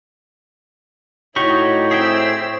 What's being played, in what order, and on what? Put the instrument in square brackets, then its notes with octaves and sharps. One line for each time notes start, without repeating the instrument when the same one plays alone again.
[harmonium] A2 C#5 [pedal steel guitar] D#4 F#4 G4 [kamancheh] E4 [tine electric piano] C#6
[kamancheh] C4 E6 [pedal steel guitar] G#4 E5 G5